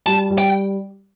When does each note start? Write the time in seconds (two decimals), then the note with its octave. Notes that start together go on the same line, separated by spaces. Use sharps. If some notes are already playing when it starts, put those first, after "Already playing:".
0.06 G3 A5
0.30 G3
0.38 G5